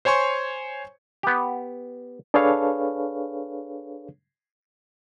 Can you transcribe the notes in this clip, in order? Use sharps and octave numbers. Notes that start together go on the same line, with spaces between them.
C5 C#5 G#5 C6 C#6
B3 G4
D4 G#4 A4 B4 C#5 F5